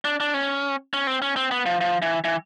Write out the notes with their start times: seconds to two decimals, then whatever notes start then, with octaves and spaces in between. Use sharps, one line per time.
0.05 D4
0.20 D4
0.34 C#4
0.94 C#4
1.07 C4
1.22 C#4
1.36 C4
1.51 B3
1.66 F3
1.81 F3
2.02 E3
2.24 E3